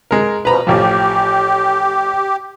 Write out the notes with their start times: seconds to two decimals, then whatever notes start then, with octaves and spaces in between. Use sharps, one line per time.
0.11 G#3 A#4
0.45 B2 F3 B4 A#5 B5
0.67 A1 F3 G4